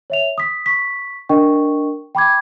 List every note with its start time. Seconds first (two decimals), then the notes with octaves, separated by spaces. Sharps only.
0.10 C#5 E5 F7
0.38 D#6 B6
0.66 C#6 B6
1.29 D4 A#4 D#5 G5 C#6
2.15 G5 B5 D6 G#6